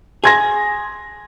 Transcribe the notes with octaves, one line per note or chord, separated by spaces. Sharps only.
G#4 C6 G#6 A#6